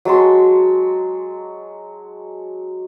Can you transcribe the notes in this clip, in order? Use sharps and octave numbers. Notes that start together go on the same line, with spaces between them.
F#3 G#3 A5 C6